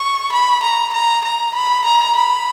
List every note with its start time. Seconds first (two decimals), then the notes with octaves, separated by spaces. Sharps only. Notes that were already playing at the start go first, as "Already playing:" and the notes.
Already playing: C#6
0.32 B5
0.63 A#5
0.94 A#5
1.24 A#5
1.54 B5
1.85 A#5
2.16 B5